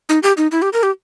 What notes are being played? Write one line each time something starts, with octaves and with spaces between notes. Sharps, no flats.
D#4
G4
D#4
E4
G4
A#4
G4